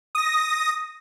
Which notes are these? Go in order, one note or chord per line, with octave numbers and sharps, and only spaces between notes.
D#6 A#6